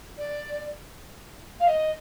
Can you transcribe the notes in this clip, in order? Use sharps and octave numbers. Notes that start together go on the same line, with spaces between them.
D5
F5
D#5